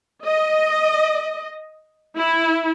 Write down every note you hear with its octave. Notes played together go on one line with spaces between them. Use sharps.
D#5
E4